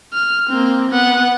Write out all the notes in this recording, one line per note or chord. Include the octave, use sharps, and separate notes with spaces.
F6
A#3 C4
B3 F#5